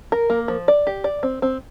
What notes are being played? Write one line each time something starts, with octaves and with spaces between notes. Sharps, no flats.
A#4
A#3
F3
D5
G4
D5
C4
C4